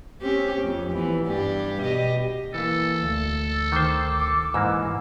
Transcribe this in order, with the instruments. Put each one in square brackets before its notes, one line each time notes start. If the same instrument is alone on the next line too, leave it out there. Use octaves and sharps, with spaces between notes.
[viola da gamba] C4 C#4 G4
F2
E3 B3
G2 D4 G4
B2 G4 D#5
[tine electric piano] E3 A#3 [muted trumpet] A4
[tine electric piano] D2
[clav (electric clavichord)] D#3 C5 [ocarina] D6
[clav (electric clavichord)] G#2 E3 A#3 [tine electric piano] E6